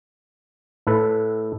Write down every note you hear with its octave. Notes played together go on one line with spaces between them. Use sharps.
A2 A4 B4